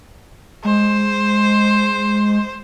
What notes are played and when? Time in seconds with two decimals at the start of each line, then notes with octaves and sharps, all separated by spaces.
0.65 G#3 C5